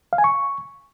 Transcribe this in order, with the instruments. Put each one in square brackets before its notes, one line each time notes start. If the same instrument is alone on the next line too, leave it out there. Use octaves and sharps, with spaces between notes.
[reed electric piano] F5
G#5
C#6